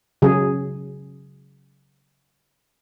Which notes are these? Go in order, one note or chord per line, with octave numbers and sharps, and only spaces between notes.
C#3 F#3 G#4